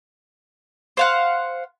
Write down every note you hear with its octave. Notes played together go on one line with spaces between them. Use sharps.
C5 F5 F#5